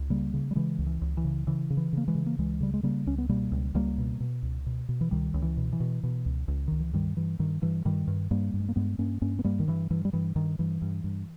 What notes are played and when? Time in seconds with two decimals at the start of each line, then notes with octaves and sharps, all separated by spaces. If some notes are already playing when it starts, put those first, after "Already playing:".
Already playing: C#2
0.10 C#3 G3 A#3
0.34 C#3
0.51 G3
0.55 C#3 E3 G#3
0.79 C#2
0.86 E3
1.01 C#2
1.17 E3
1.24 C#3
1.47 C#3 E3
1.70 C#3
1.77 E3
1.93 C#3 A#3
2.08 E3 G#3
2.15 C#3
2.26 A#3
2.39 C#2 E3 G#3
2.61 C#3 G3
2.74 G#3
2.83 C#3 G3 A#3
3.06 C#2 C#4
3.18 B3
3.29 B2 G3 A#3
3.52 C#2
3.74 C#2 G3 A#3
3.98 B2
4.20 B2
4.43 C#2
4.66 B2
4.89 B2
5.01 E3
5.11 C#2 D#3 G3
5.34 C#2
5.42 E3
5.57 B2
5.73 E3
5.80 B2
6.03 B2
6.26 C#2
6.48 C#2
6.68 C#2 D#3
6.80 E3
6.93 G2 D#3 G3
7.17 G2 E3
7.39 G2 D#3
7.62 G2 E3
7.85 G2 D#3 G3
8.07 G2
8.31 G2 G3 A#3
8.54 G2
8.60 G#3
8.69 A#3
8.76 G2 G#3 B3
8.98 G2 A#3 C#4
9.22 G2 A#3 C#4
9.39 B3
9.44 G2 G3 A#3
9.60 D#3
9.67 G2 E3
9.91 G2 E3
10.05 G3
10.13 G2 E3
10.36 G2 D#3
10.59 G2 E3
10.82 G2
11.04 G2